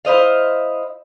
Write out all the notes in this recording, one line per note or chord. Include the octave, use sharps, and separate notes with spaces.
E4 C5 D#5 F5